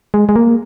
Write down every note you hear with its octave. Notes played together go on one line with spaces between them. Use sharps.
G#3
G#3
A#3